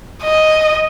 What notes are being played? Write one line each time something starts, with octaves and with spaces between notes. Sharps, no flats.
D#5